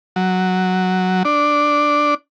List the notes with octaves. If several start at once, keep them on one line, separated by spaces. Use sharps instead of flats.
F#3
D4